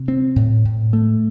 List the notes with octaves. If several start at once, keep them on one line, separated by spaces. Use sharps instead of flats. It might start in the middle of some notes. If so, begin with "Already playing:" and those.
Already playing: C3
C4
A2
A2
A3